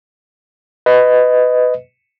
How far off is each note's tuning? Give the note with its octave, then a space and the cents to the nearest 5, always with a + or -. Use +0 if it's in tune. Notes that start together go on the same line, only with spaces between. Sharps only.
B4 +20 D#5 +0